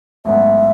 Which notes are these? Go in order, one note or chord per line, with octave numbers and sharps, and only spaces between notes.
A1 G#2 F#3 B3 E5